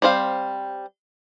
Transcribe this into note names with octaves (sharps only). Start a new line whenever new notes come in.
G3 C4 C5 F5